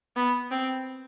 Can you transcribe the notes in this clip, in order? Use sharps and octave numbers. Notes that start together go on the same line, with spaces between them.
B3
C4